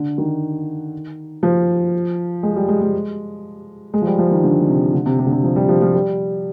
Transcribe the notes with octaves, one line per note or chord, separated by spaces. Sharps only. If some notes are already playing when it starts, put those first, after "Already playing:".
Already playing: D3
D#3
F3
G#3
G3
G#3
G#3
G#3
F3
G3
F3
D#3
D3
D3
C3
D3
C3
C3
D3
C3
F3
G3
F3
F3
G3